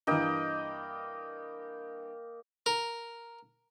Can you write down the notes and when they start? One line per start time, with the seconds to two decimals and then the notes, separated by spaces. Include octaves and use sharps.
0.07 G2 E3 A#3 D#5 G5
2.66 A#4